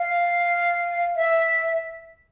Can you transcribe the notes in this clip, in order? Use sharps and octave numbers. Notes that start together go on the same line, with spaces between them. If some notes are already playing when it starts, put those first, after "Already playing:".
Already playing: F5
E5